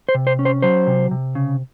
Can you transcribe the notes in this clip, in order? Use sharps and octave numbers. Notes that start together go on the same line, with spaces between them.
C5
C3
C5
C#4
C5
F#3 C5
C3
C3
C#3